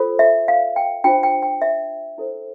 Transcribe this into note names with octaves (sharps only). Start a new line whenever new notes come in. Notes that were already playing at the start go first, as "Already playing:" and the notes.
Already playing: F4 A4 C5
E5
F5
G5
D4 F4 C5 G5
G5
G5
E5
E4 A4 C5